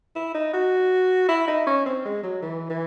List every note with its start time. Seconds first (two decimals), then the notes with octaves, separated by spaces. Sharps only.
0.16 E4
0.34 D#4
0.53 F#4
1.29 E4
1.48 D#4
1.67 C#4
1.86 C4
2.05 G#3
2.23 F#3
2.42 E3
2.70 E3